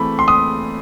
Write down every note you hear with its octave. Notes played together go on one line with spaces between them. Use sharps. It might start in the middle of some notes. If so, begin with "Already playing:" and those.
Already playing: E3 A3 C4 B5
C6
D#6